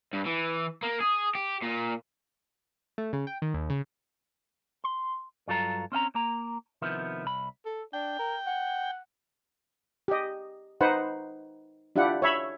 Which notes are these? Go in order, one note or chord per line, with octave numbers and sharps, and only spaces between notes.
G2
E3
A#3
G#4
G4
A#2
A3
C#3
G5
D#3
D#2
C#3
C6
G2 F#3 F4 A4 A#4 A#5
C4 C#4 F#5 A#5
A#3 A#5
C3 D#3 F3 B3 E4
C2 B5
A4
D4 G5
A#4
F#5
G4 D#5
D#4 B4 C5 F#5
D4 E4 F4 G4 F#5
C#5 E5 B5